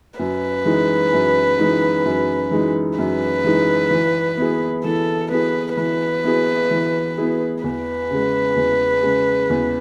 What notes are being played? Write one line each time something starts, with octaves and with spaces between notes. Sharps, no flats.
F#2 B4
E3 G#3 D#4
F#2
E3 G#3 D#4
F#2
E3 G#3 D#4
F#2 B4
E3 G#3 D#4
E3
B3 E4 G#4
E3 A4
B3 E4 G#4 B4
E3 B4
B3 E4 G#4
E3
B3 E4 G#4
E2 B4
C#3 G#3
E2
C#3 G#3
E2